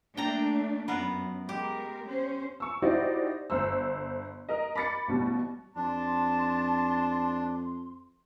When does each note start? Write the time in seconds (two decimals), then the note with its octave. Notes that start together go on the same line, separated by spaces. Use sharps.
0.17 A3 A#3 D4 G5 A#5
0.88 F#2 B3 F4 A#4
1.49 G#3 G4 A#4
2.07 C#4 C5
2.60 C#6 E6
2.82 D#4 E4 F#4 G4 C5 D5
3.50 G1 C5 E6
4.49 A#4 D#5
4.76 B5 D6 A6 C#7
5.08 A1 B2 G3
5.76 F2 D4 A5 C6